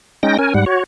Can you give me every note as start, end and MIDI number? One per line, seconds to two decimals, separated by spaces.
0.23 0.37 56
0.23 0.37 61
0.23 0.37 63
0.23 0.37 79
0.23 0.37 94
0.39 0.54 61
0.39 0.54 70
0.39 0.54 80
0.54 0.65 44
0.54 0.65 55
0.54 0.65 78
0.66 0.84 66
0.66 0.84 73